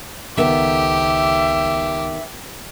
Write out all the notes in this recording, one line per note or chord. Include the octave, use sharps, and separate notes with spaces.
C#2 D#3 B3 G4 A4 E5